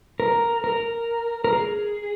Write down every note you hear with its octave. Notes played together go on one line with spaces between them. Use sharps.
A#4
A#4
A#4
G#4